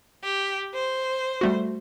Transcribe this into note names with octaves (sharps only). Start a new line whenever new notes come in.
G4
C5
G3 A3 F#4